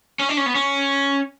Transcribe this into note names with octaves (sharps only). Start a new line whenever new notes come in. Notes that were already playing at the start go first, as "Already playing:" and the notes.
C#4
D4
C#4
B3
C#4